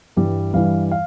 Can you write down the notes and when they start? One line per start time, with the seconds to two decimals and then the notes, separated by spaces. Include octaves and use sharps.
0.17 G2 E3 G3
0.53 G2 E3 G3 F5
0.91 F5